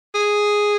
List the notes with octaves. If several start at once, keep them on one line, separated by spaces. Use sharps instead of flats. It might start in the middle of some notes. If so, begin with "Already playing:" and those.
G#4